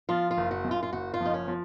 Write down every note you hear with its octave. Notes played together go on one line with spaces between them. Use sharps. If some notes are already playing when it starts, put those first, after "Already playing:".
F3 F4
F4
F#1
F#4
F#2
F4
F4
F#1 F#4
F4
F3 D#4
C#4
F3